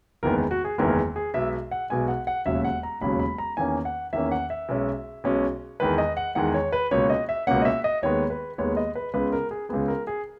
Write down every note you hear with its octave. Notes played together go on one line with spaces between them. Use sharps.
F#1 E2 D#3 G#3 B3 A#4
F#4
G#4
F#1 E2 D#3 G#3 B3 A#4
G#4
B1 B2 G#3 E5
F#5
B1 B2 G#3 G#5
F#5
F#5
E1 D#2 C#3 F#3 E5
F#5
A#5
E1 D#2 C#3 F#3 B5
B5
A#5
E2 D#3 A#3 C#4 G#5
F#5
E2 D#3 A#3 C#4 E5
F#5
E5
B1 B2 G#3 C#4
B1 B2 G#3 C#4
E2 D#3 G#3 B4
D#5
F#5
E2 D#3 G#3 F#5
C#5
B4
C#2 B2 A#3 C#4 C#5
D#5
E5
C#2 B2 A#3 C#4 F#5
D#5
E5
D#5
D#2 D#3 G#3 B3 C#5
B4
D#2 D#3 G#3 B3 C#5
D#5
B4
C#2 C#3 G#3 B3 B4
A#4
G#4
C#2 C#3 G#3 B3 G#4
A#4
G#4